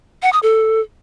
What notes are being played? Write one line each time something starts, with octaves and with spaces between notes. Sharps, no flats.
F#5
D#6
A4